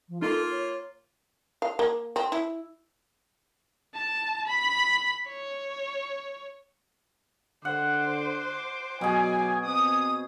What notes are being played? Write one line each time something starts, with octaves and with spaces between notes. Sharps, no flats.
F3
A#3 D#4 F4 A4 C6
C#5
F5
A#3
C4
E4
A5
B5
C#5
D3 C5 F#5 D6
B2 F#3 G#4 G#5
C4 D#6